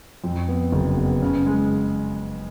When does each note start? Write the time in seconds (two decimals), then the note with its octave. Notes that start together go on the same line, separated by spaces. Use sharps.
0.24 F2
0.48 B3
0.72 F#1
0.97 B3
1.22 C#3
1.46 G#3